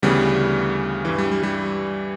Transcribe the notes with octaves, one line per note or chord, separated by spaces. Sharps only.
D2 C#3 E3 G3 B3
G2 E3
G3
G3
G3